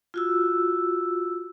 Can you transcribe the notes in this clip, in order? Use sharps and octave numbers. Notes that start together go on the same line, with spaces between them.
F4 F#4 E6